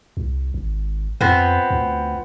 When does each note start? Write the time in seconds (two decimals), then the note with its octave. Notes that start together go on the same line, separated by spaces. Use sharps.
0.17 C2
0.54 G#1
1.21 F2 F3 B3 C4
1.70 D2